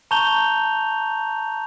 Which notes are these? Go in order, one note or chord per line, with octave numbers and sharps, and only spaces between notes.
A5 A#5 C#6 G6 F7 G7